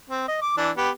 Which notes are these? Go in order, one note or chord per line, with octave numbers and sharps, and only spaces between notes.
C4
D#5
D6
E3 D4
B3 G4